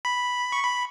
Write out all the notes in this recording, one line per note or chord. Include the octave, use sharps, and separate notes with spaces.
B5
C#6
B5